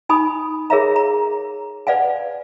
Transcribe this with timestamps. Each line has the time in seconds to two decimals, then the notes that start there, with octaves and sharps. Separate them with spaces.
0.09 D#4 G#5 B5 D#6
0.70 G#4 A#4 C#5 E5 F5 A#5
0.96 A#5
1.87 B4 D5 F5 F#5 G#5